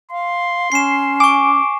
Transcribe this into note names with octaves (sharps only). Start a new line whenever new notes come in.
F5 C6
C#4 C7 E7
G#5 C#6 D6